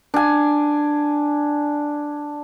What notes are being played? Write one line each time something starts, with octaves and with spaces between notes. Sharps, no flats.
D4 G#5